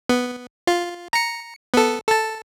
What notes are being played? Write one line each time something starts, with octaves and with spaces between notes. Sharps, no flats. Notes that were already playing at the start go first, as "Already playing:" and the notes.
B3
F4
A#5 C#7
B3 A4
A4 A5